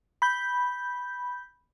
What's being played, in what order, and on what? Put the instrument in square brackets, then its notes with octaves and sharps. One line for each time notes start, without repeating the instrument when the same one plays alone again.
[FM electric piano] B5 G6